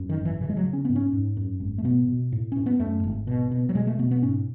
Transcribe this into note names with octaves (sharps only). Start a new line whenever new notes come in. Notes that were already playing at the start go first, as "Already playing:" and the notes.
Already playing: F#2
D#3
G#1
E3
C#3 E3
G#3
F#3
C#3
C#4
G#2 B3
C#4
G#2
F#2
G#1
A3
B2 B3
B2
A2
A2 C#4
B3
F#2 A3
G#1
B2
B2
F#3
B2 G#3
A3
B2 B3
B3
G#2 C#4